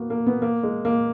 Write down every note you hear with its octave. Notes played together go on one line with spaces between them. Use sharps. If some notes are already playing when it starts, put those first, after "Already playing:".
Already playing: A#3 B3 F#4
A#3
B3
A#3
G#3
A#3